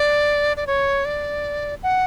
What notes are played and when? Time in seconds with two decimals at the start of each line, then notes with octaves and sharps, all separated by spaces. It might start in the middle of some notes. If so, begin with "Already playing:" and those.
Already playing: D5
0.57 D5
0.67 C#5
1.05 D5
1.83 F#5